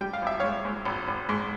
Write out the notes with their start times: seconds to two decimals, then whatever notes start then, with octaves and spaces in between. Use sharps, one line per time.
0.01 G3 G5
0.13 F5
0.22 G#1 E5
0.40 G#2 C#5 F5
0.65 G#2
0.85 G#1
1.08 G#1
1.29 G#2